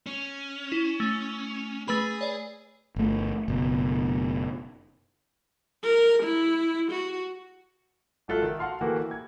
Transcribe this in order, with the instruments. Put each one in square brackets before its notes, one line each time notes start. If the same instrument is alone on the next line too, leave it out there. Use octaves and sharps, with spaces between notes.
[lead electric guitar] C#4
[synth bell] E4
A3
[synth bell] A3 B4 B5 [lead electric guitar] G#4
[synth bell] C#5 D5
[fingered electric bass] G1 A3
F#1 B2
[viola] A#4
E4
F#4
[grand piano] G#1 F#3 F4 A4 E5 F#6
D#3
F#4 F5 F#5 A5 C6 F6
D#3 E3 A#3 F#4 G4 A4
E3
G#6